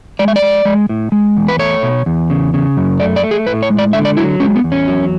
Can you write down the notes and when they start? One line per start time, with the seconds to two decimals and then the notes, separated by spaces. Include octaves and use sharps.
0.19 G#3 D5
0.28 E5
0.36 D5
0.42 G#3
0.65 G#3
0.89 A2
1.12 G#3
1.37 E2
1.48 B4
1.59 A3 C#5
1.83 B2
2.06 E2
2.30 C#3
2.54 C#3
2.77 F#2
3.00 A3 D5
3.16 D5
3.23 A3
3.31 G#4
3.47 A2 B4
3.63 C#5
3.70 G#3
3.78 D5
3.93 D3 E5
4.05 D5
4.17 F#3 E4
4.40 G#3 C#4
4.56 B3
4.64 E2
4.72 C#4
4.88 F#3